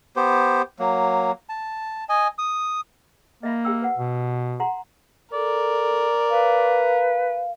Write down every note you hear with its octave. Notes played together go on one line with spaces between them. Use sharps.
B3 G4 C5
F#3 A#3
A5
D#5 G#5
D#6
A#3 D#5 E5 B5
G4 G5 E6
B4 F#5
B2
F#5 A#5 C6
A4 A#4 D5
B4 F5